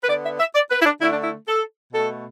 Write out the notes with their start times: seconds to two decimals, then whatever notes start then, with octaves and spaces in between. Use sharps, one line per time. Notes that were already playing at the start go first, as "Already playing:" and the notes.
0.03 B4
0.09 D3 B3 D5
0.25 E5
0.40 E5
0.55 D5
0.71 B4
0.81 E4
0.85 D4
1.01 D3 A3 E4
1.12 D4
1.24 E4
1.48 A4
1.93 B2 A3 A4